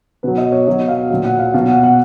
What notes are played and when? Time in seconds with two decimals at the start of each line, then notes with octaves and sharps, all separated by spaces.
0.23 B2 F#3 B4
0.38 D#5
0.52 C#5
0.67 B2 F#3 D#5
0.88 F5
1.10 A#2 F#3
1.24 F#5
1.39 F5
1.54 B2 F#3 F5
1.68 F#5
1.83 F#5